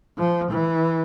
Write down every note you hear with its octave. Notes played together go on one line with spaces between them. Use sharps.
F3
E3